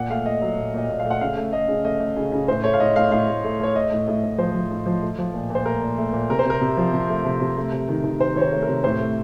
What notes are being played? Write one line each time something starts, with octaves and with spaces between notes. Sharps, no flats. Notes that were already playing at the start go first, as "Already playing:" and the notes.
Already playing: A#2 F#5
A3 F5
A3 D#5
F#3
A#2
A#2 D#5
A#2
F5
A3
F#5
C#3 F5
A3
A3 D#5
C#3
A3 D#5
A3
C#3
C#3
A2 C5
A3 C#5
F5
A2 D#5
A2 F5
A2 F5
A2
A3
A3 C#5
A3 D#5
A2
A2
A2
F3 C5
F3
A2
F3
A3
F3
A#2
A#2 C5
A3 A#4
A#2
A3
A#2
C3 A#4
C5
C3 A#4
C3
F3
C3
A3
C3
C3
A3
C3
D#3
D#3
D#3 C5
D#3 C#5
C5
A3
A#4
C3
A2 C5
A3